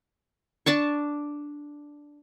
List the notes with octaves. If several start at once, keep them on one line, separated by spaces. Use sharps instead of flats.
D4 A5 C#6